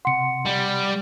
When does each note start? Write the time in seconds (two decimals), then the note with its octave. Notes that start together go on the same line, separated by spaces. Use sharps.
0.05 C3 F#5 C6 C#7
0.46 G3